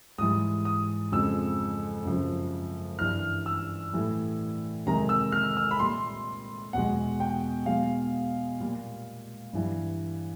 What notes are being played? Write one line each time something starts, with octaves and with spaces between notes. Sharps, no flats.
G#2 E3 G3 D#6
D#6
F2 C#3 F3 G#3 E6
F#2 C#3 F3
G2 E3 G3 F6
E6
A2 E3 G3
F2 C3 D#3 G#3 A#5
E6
F6
E6
B5
A#2 G3 C6
E2 B2 G#3 F#5
G5
B2 G#3 F5
A#2 G3
G2 E3 G3